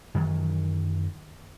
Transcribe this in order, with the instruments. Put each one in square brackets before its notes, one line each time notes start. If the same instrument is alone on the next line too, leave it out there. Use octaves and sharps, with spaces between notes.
[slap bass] F#2 D#3 E3 F#3